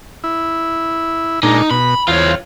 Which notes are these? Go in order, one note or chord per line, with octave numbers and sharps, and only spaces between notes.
E4
A#2 G#3 D4 D#4
B2 B5
E2 F4 C5 C#5 F5